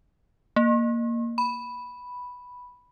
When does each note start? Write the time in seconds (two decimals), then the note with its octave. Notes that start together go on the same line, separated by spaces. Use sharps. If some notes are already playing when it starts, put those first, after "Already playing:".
0.56 A#3
1.38 B5